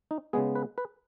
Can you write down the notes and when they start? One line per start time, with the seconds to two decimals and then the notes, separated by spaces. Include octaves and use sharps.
0.11 D#4
0.33 C#3 G#3 B3 G#4
0.55 B4
0.78 B4